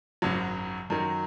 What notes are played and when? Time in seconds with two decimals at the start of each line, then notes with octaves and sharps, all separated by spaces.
0.22 G#1 F#2 C#3 F#3
0.90 F#2 D#3 F#3